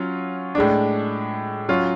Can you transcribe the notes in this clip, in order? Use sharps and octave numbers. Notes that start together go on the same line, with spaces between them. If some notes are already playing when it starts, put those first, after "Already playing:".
Already playing: F#3 C#4 F4
A2 G#3 D4
F#3 C#4 F4